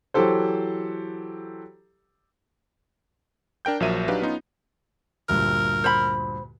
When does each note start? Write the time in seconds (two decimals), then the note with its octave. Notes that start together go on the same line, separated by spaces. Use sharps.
0.14 E3 F#3 G4 A4 C5
3.65 D4 A#4 G5 G6
3.80 A#1 F3 F#3 A#4 E5 D#7
4.08 F#3 D4 D#4 G4 B4 F5
4.21 B3 C#4 D#4 F4
5.29 D2 G2 A#2 A#4
5.84 C5 B5